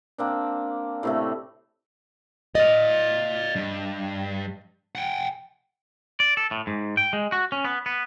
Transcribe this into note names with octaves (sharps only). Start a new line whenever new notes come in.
A#3 C4 D4
A2 C3 A3
D5 D#5 F5
G2
F#5 G5
D5
A4
A2
G#2
G5
G#3
F#4
C#4
B3
B3